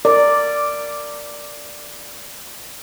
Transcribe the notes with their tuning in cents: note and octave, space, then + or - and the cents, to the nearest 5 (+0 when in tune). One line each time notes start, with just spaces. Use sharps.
A#4 -25 D5 +0